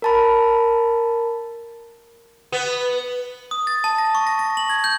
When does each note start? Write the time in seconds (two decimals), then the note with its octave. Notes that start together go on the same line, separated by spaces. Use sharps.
0.02 A#4 A5 B5
2.52 B3
3.51 D#6
3.67 A6
3.84 A5
3.98 A#6
4.15 C#6
4.27 A#6
4.39 A#6
4.57 F#7
4.70 G#6
4.84 G6